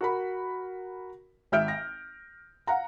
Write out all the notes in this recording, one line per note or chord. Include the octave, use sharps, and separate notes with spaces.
F#4 A#4 B5
G#1 E5 F6 G6 D7
A#6
F5 F#5 A#5